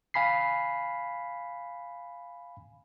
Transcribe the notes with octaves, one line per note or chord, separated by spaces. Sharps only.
F5 G#5 B5 B6 C7